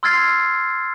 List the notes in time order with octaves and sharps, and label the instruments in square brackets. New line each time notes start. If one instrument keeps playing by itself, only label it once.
[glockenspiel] C6 E6 F6 G#6 A6 C7